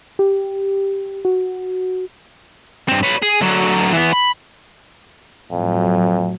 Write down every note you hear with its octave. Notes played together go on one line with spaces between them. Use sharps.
G4
F#4
G2 C4
B4 C#5
G#4
D3 F#3
E3 B3
B5
F2 A2 F#3